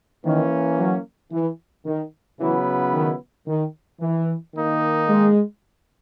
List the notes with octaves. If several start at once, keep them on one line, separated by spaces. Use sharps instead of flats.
D#3 E3 A#3 C#4
F#3
E3
D#3
C#3 E3 F#3 B3 E4 B4
D#3
D#3
E3
D#3 A#3 D#4
G#3